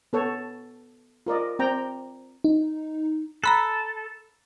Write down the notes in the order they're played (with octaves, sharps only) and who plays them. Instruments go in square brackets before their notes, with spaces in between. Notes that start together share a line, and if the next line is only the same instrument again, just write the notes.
[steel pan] B3 A4 C#5
F4 A#4 D5 D#5
C4 D5 G5 A#5
[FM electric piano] D#4
[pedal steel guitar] A4 [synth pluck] A#5 B5 F#6